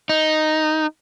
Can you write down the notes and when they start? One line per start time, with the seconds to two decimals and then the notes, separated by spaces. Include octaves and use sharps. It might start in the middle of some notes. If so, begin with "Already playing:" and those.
0.09 D#4